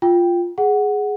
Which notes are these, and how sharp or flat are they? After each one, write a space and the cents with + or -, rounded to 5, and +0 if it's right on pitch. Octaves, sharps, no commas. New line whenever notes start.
F4 +0 G5 +0
G#4 +5 F#5 +0